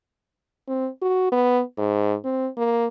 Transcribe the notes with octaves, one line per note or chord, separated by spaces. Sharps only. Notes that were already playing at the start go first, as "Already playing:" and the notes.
C4
F#4
B3
G#2
C4
A#3